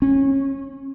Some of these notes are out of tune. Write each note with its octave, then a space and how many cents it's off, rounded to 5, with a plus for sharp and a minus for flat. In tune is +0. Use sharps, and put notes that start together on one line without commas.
C#4 -25